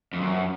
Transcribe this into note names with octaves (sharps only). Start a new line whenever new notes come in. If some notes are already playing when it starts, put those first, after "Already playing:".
F2
F#2